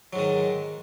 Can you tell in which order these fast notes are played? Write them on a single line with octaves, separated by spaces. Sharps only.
F#3 G#2 D#3